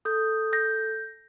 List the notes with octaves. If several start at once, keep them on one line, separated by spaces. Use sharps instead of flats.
A4 D#6 G6
G6 A#6